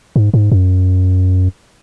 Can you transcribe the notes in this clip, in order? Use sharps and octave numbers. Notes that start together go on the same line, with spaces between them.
G#2
G#2
F#2